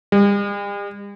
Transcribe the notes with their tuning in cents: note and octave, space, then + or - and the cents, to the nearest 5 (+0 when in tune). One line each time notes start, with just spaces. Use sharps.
G3 +45